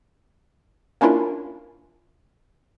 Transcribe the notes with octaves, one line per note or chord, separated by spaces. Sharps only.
A#3 C#4 D4 E4 F4 A#4